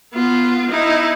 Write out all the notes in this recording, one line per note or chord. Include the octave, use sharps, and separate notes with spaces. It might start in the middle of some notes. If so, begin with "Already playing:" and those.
B3 F4
D#4 E4